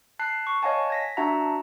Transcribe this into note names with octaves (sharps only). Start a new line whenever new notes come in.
A5 F#6 C7
C#6
C#5 D#5 F5 F#5 G#5 A5
G#6 A#6 B6
D4 F#4 E5 F#5 A5 A#5